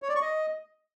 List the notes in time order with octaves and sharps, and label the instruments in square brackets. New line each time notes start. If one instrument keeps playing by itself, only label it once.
[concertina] C#5
D5
C#6
D#5